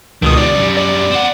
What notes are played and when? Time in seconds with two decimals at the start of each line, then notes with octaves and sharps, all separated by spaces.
0.22 C#2 B2 D#3 D#6
0.37 C#3 G3 D5
0.53 F#2 G3
0.76 D5
1.11 C4 F#5